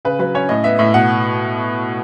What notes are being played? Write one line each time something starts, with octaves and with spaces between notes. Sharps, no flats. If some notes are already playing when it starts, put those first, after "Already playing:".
C#3 B4
F#3 B4
C#4 C#5
A2 D#5
B3 E5
A2 E5
B2 F#5